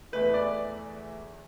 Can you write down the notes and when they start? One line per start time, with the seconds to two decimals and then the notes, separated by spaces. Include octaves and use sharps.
0.12 E2 E3 A3 B4
0.34 D5